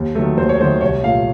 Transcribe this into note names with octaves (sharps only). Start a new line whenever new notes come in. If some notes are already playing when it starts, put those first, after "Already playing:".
Already playing: D#2
D#3 F#3 A3
D#2 C5
C#5
D#3 F#3 A3 C5
C2 C#5
A#2 A3 F5